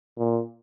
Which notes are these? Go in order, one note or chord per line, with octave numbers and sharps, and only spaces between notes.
A#2